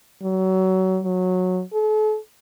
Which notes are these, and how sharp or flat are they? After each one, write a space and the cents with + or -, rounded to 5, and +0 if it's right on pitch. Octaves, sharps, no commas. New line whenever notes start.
F#3 +25
F#3 -15
A4 -40